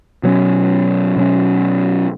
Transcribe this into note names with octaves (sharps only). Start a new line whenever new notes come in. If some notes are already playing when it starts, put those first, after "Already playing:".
B2 F#3 C#4
B2 F#3 C#4